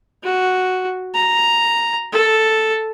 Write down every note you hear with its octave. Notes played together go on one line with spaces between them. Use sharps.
F#4
A#5
A4